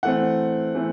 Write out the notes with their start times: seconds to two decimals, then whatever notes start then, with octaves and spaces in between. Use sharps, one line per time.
0.03 E3 A3 C4 F#5
0.75 E3 A3 C4